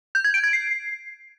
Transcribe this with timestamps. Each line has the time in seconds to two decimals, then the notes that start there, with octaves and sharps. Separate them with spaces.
0.15 G6
0.24 G#6
0.34 D7
0.44 G#6
0.53 C7